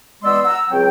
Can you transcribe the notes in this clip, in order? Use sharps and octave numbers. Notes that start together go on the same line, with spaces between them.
E3 G#3 B3 D5 C6 E6
F#5 A#5 E6
C#2 F#3 C4 C#5 G5